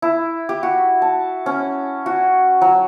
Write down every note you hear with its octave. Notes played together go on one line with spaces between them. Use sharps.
E4
G4
F#4
A5
C#4
F#4
F#3